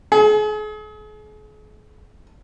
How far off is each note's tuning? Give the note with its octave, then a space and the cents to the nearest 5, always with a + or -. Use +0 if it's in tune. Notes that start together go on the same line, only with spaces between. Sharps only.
G#4 +40